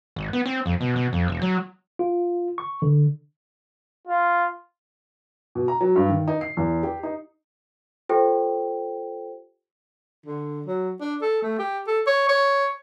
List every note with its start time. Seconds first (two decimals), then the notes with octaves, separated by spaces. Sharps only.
0.16 G#1
0.33 B3
0.46 C4
0.66 F2
0.81 B2
0.96 B2
1.13 F2
1.28 E1
1.42 F#3
1.99 F4
2.58 C#6
2.82 D3
4.07 F4
5.55 B2
5.68 A#5
5.81 F#3
5.96 G2
6.09 D#3
6.28 D#4
6.41 C7
6.57 E2
6.83 G4
7.03 D#4
8.09 F4 G4 A4 C5 G5
10.26 D3
10.66 F#3
11.01 D4
11.22 A4
11.43 A3
11.59 G4
11.87 A4
12.07 C#5
12.29 C#5